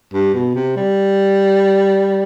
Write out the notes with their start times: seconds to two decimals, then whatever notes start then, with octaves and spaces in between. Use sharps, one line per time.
0.14 G2
0.34 B2
0.55 C3
0.76 G3